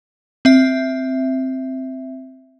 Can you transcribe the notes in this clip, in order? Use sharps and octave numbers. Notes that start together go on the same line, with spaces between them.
C4 E5